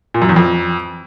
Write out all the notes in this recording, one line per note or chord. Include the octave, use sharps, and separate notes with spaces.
A#2
F#2
E2
F2